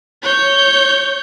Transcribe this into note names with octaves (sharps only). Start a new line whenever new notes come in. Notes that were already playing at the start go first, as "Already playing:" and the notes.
C#5 G6